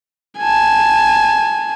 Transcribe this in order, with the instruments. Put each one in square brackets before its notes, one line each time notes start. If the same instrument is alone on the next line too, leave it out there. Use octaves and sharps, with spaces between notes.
[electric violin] G#5 A5